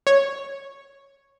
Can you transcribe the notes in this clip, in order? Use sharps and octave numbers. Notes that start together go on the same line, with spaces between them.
C#5